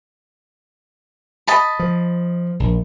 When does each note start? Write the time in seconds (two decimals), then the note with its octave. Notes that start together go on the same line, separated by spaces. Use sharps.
1.47 D#5 A5 B5
1.79 F3
2.60 A#1